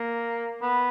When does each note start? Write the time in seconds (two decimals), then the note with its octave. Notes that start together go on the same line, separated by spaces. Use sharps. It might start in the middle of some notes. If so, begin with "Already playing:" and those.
Already playing: A#3
0.62 B3